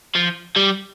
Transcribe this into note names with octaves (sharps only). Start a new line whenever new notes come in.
F3
G3